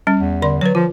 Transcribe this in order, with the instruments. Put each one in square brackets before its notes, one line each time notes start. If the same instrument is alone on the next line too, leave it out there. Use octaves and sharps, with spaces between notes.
[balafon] G3 C#4
[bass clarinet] E2
[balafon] D3 D5 C6
[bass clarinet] F#3 [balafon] B4 C#5
[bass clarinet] F3 [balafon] F4